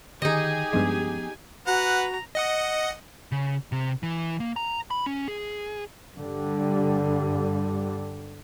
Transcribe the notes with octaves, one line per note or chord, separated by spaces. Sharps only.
D3 D#3 D#4 G4 G#4 D#5 G#5
G2 F3 G#3 B3 C#4
F#4 B4 F#5 A#5
D#5 F#5 D#6
C#3
C3
E3
A#3
A#5
B5
C#4
G#4
G2 D3 G3